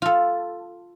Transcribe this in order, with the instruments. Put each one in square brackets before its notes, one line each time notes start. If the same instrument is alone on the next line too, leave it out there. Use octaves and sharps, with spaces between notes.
[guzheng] F4 A4